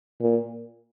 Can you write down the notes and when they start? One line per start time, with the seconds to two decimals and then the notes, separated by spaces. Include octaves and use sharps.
0.21 A#2